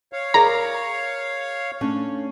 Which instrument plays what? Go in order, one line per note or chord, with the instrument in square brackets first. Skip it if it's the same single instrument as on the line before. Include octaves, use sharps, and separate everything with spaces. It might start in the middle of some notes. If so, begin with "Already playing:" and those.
[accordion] C#5 F5
[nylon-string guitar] G#4 A#4 D5 [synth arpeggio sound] A#5
[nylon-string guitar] A3 C#4 D4